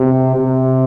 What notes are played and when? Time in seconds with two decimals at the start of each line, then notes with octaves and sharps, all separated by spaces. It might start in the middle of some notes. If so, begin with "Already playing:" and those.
Already playing: C3
0.35 C3